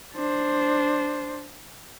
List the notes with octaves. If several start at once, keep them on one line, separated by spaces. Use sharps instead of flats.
D4 C5